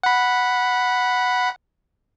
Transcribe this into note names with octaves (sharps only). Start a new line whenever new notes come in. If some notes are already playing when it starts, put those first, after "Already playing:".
F#5 B5